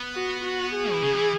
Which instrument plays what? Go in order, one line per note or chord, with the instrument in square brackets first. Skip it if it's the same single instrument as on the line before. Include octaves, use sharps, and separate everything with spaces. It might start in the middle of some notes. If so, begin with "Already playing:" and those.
Already playing: [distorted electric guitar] B3
[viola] F#4
F#4
G#4
[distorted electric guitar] E3
C#3
F#3
E3